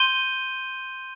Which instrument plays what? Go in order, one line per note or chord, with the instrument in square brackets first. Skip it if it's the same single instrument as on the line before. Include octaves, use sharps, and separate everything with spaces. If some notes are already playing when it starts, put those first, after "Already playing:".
Already playing: [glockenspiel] C6 G6 D#7 G7